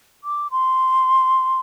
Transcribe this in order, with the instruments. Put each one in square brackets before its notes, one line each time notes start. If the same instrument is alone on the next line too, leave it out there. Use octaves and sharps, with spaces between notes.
[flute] D6
C6